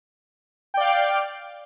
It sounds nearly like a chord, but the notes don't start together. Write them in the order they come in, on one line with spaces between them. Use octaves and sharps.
G5 D5 F5